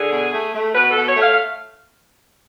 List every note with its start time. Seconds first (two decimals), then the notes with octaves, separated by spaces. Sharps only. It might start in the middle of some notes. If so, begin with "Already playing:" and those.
Already playing: D3 G#4
0.11 B2
0.33 A3
0.54 A3
0.74 B2 B4
0.90 A4
0.96 B2
1.06 C#5
1.16 A3
1.22 F5
1.32 F5